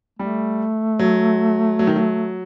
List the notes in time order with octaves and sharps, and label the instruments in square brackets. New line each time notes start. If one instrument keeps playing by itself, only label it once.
[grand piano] G3 [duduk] A3
[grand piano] F#3
F#3
D#3
F#3